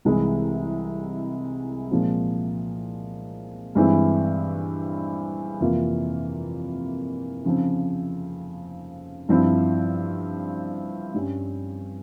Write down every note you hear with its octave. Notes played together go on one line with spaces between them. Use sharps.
C2 C3 E3 G#3 E4
A#2 F3 G#3 C4
G2 E3 G#3 C4 E4
F2 C3 E3 A#3 F4
C#3 F3 C4
G2 F3 C4 E4
G2 G3 C#4